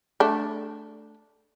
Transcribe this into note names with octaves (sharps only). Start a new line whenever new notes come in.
A3 D4